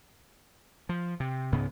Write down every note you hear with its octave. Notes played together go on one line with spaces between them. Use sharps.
F3
C3
C#2 G#2 C#3 B3